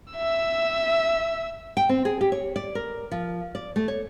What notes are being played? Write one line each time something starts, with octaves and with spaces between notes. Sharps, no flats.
E5 E6
G5
C4
G#4
G4
C#5
D5
A#4
F3
D5
A3
C#5